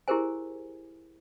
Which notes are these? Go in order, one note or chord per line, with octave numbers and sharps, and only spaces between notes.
E4 G4 G#4 A#4 C5 G#5